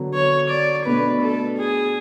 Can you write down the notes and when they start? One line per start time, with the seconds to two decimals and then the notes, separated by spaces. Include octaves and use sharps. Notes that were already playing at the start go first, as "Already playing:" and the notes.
Already playing: D3 F#3 B3
0.14 C#5
0.51 D5
0.86 B2 A3 D4 B4
1.22 A4
1.58 G#4